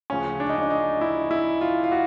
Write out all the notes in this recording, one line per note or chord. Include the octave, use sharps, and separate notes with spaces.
D2 C#3 F3 C#4
D4
D#4
D4
D#4
E4
E4
F4
F4
F#4